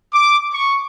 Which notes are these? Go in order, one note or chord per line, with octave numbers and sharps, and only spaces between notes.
D6
C#6